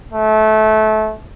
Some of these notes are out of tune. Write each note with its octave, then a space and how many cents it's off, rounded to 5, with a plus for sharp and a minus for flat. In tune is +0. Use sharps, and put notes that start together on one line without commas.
A3 -25